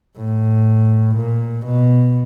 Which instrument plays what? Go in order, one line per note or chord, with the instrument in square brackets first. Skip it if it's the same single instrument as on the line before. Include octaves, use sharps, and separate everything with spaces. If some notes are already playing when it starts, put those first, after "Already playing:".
[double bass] A2
A#2
B2